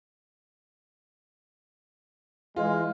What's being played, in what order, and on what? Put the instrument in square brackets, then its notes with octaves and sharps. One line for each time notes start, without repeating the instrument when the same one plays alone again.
[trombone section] E3 G#3 [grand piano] F4